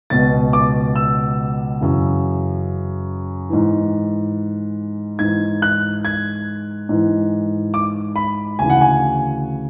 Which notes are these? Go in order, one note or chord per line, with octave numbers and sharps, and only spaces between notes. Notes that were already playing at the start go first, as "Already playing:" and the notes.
C#2 B2 A6
D6
E6
F#2 C#3 E3
G#2 E3
G#2 E3 G#6
F#6
G#6
G#2 E3
D6
B5
D2 C#3 E3 G#5
F#5
G#5